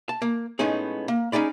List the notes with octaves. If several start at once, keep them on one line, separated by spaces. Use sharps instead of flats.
A5
A#3
A2 G#3 B3 C#4 D#4 G#4
A#3
C#4 D#4 G#4 D5 B5